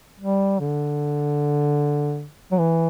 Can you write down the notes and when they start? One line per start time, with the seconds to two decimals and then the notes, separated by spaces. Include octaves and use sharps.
0.20 G3
0.60 D3
2.52 F#3
2.59 E3